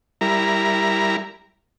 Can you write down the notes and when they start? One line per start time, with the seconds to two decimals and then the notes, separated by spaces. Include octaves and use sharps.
0.21 G3 E4 A#4 A#5